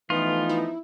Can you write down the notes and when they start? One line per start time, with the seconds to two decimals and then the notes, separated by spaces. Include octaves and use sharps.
0.10 E3 F3 A3 B3 D#4 F4
0.49 E4